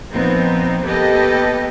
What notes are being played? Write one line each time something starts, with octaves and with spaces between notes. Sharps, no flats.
A#2 F3 B3 C4 D#4
A#3 B3 G4 A4 B4 D#5